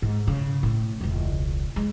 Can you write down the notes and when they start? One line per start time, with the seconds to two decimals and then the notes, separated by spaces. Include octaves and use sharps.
0.02 G#2
0.27 C#3
0.63 A2
1.01 E1 C#2
1.76 G#3